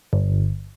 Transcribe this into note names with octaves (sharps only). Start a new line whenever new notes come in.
G1